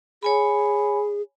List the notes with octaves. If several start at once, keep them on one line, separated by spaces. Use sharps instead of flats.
G#4 C#5 G#5 B5